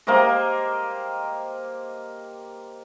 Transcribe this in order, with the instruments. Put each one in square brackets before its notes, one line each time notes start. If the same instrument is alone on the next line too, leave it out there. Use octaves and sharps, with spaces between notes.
[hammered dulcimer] A#3 G4 C5 D#5